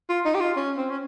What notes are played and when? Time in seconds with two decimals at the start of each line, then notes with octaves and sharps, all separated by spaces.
0.09 F4
0.25 D#4
0.35 G4
0.40 F4
0.56 C#4
0.77 C4
0.90 C#4